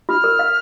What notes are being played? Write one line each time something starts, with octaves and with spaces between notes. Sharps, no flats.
F4 F6
A#4
F5